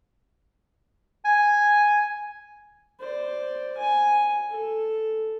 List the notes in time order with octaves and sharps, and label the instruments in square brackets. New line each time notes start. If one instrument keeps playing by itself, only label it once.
[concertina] G#5
[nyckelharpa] C5 D5
G#5
A4